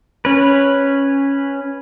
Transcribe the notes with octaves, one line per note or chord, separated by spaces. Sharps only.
C#4 B4